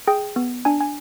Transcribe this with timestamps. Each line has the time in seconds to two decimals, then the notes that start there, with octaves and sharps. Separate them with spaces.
0.07 G#4 G5
0.36 B3
0.65 D4 G#5
0.81 G#5